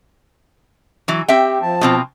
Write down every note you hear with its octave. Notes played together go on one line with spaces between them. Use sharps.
E3 F#3
C4 G4 E5 G5
F3 A5
B2 C4 F4